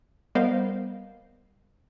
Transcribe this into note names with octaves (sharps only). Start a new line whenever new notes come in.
G3 B3 A#4 C5 D#5 F5